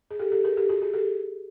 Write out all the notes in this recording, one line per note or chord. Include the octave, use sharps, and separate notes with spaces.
G#4
G4 A4
G4 A4
G#4 A#4
G4 A4
F#4 G#4
F#4 G#4
G4 A4